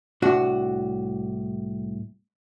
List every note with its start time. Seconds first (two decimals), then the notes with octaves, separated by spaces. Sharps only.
0.22 C2 A2 D4 F#4